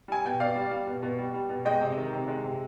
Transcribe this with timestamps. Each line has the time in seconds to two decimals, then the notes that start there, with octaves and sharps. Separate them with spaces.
0.08 G3 G#5
0.25 B2 G5
0.40 B2 D5 F5
0.56 G3
0.71 G3
0.87 B2
1.03 B2
1.18 G3
1.34 G3
1.50 B2
1.65 G#3 D#5 G5
1.81 C3
1.97 D#3
2.13 C3
2.28 G#3
2.44 C3